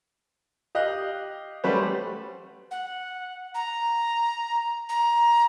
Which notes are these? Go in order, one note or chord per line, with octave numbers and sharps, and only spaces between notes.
G4 D#5 F5 F#6
G3 A3 C#4 F#4 B4 C5
F#5
A#5
A#5